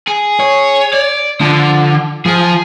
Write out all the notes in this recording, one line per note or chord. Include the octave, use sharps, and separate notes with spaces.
G#4
C#5
D5
D3 F3
F3 G#4